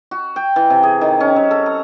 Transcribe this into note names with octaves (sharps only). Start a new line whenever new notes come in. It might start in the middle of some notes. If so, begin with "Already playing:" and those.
F#4
G5
E3
C3
G#4
D#3
C#4
F#3
A4
A#5